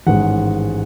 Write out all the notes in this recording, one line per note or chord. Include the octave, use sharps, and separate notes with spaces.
A1 G#2 D#3 G#3 F#5